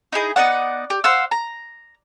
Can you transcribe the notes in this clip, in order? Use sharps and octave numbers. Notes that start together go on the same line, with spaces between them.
D#4 E4 G#4 D#5
B3 D#4 D5 F#5
G4
C5 F5 F#5 E6
A#5